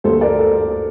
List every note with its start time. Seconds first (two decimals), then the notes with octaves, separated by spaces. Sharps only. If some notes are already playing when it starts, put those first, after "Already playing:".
0.04 D2 D3 G3 A#3 A4 C5
0.21 A#4 D5
0.39 A4